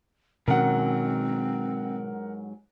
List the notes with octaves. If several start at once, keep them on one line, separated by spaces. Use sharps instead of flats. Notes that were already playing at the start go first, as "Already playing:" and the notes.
G#2 B2 D#3 F#3 C4 C#4 A#4 F#5